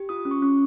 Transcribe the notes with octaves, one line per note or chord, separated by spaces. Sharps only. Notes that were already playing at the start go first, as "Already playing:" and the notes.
Already playing: G4
F4 D#6
C#4
C#6
C#4